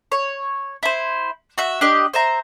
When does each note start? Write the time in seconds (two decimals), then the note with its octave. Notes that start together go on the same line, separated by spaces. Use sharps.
0.12 C#5
0.83 E4 C5
1.58 F#4 E5
1.81 D4 G4 D#5
2.14 C5 E5 A#5